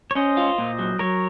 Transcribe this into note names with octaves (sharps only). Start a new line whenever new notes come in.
C#5
C#4 C5 D#5
F4
A#2
F#3
F#3 A#4 C#5